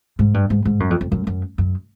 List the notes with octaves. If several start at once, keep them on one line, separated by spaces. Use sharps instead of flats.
G#2
G2
G#2
G#2
F#2
F2
F2
F#2
F#2
F#2